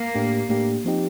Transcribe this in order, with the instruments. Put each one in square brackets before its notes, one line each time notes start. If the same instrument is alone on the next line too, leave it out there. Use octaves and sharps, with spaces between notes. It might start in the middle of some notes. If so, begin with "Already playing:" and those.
Already playing: [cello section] A#3
[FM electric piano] A2 A3 D4 G4
A2 A3 D4 G4
F3 C4 D#4 G4